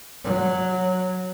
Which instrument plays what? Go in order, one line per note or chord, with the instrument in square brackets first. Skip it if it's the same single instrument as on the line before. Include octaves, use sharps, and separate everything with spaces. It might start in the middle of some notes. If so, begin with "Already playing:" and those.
[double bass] F#3